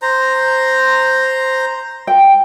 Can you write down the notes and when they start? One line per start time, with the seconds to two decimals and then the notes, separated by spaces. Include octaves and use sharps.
0.02 C5 A#5
2.07 G5